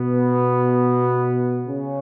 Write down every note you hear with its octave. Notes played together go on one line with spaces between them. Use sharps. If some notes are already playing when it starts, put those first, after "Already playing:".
Already playing: B2 B3
C#3 C#4